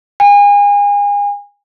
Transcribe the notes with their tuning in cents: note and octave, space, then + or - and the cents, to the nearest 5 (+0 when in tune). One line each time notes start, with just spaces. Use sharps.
G#5 -35